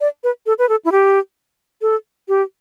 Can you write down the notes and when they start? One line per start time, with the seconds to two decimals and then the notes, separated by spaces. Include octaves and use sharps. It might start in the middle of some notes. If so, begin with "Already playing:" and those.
0.01 D5
0.24 B4
0.46 A4
0.59 B4
0.69 A4
0.85 E4
0.92 G4
1.82 A4
2.28 G4